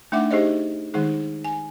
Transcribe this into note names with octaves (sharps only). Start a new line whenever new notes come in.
A3 D4 D#4 E5 F#5 D6
D#4 G4 G#4 C5 C#5 D#5
D#3 G#3 D#4 G#4
G#5